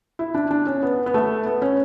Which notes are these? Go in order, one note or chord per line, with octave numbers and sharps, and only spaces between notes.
E4
D4
D4
C#4
B3
B3
A3
B3
C#4